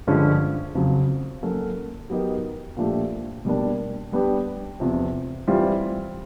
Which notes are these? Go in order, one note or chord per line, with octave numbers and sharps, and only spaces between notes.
G2 D3 F3 G#3 C#4
F2 C#3 F#3
F#3 A#3 C#4 F#4 A4
F#3 B3 D#4 G4 A#4
A#2 F3 A3 D4 G4
B2 G3 A#3 D4
G3 B3 D4 G4
E2 C3 F3
E3 G3 C4 F4